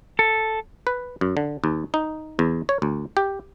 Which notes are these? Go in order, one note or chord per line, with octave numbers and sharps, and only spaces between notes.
A4
B4
F#2
D3
D#2
D#4
E2
C#5
D2
G4